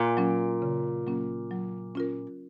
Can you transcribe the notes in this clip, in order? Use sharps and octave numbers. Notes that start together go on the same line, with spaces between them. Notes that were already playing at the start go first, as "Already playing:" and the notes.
Already playing: A#2
F#3 A#3 C#4
C#3
F#3 A#3 C#4
F#3
C#4 F4 A#4